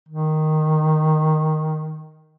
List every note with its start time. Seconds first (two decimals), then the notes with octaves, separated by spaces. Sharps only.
0.08 D#3